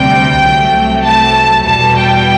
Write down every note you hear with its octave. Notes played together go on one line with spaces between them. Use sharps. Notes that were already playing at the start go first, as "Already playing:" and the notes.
Already playing: D2 C3 G3 G5
C2 C3 F#3 A3
A5
E2 B2 G3 A5
G5